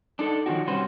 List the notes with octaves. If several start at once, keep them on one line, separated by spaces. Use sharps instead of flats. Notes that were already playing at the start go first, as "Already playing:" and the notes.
D4 D#4 A4
D#3 F3 F#3 D4 F#4
C3 G3 C#4 F#4 B4 C5